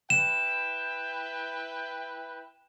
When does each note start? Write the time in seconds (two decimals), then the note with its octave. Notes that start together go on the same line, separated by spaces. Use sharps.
0.10 E4 B4 G5 E7